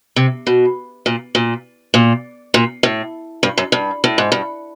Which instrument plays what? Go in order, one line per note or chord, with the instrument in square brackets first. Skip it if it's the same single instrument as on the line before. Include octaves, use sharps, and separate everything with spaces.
[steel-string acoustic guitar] C3
B2
A#2
A#2
A#2
A#2
A2
G2
F#2
G2
A2
G#2
G2